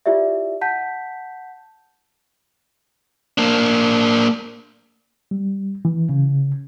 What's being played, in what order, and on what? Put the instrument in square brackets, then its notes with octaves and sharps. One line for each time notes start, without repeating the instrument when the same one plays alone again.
[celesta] E4 F4 G4 D5 E5
F#5 A5 G6 B6
[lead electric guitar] A#3 D4
[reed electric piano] G3
E3
C#3